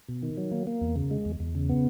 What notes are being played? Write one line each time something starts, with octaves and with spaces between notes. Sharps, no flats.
B2
D#3
F#3
A#3
A#3
E2
C#3
G#3
E2
E2
C#3
B3